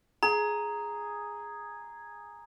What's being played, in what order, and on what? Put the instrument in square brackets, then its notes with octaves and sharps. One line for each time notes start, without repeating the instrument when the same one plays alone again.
[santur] G#4 [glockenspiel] A#5